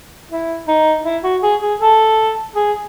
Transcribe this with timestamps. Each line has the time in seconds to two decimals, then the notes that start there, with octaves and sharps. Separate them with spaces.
0.30 E4
0.68 D#4
1.04 E4
1.24 F#4
1.43 G#4
1.61 G#4
1.79 A4
2.55 G#4